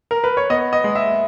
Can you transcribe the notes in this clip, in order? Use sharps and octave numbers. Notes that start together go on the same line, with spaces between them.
A#4
B4
C#5
B3 D#5
D#5
G#3
E5